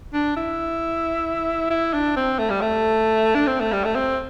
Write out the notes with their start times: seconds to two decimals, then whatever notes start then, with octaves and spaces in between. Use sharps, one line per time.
0.14 D4
0.37 E4
1.70 E4
1.94 D4
2.16 C4
2.39 A3
2.50 G3
2.61 A3
3.35 D4
3.47 C4
3.60 A3
3.72 G3
3.85 A3
3.95 C4